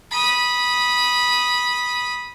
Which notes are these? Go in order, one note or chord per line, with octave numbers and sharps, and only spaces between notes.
B5 D#6